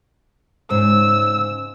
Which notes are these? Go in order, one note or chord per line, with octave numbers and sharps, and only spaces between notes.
G#2 C#3 E6